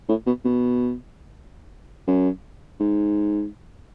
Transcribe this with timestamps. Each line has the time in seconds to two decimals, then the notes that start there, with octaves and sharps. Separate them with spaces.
0.09 A2
0.26 B2
0.45 B2
2.07 F#2
2.80 G#2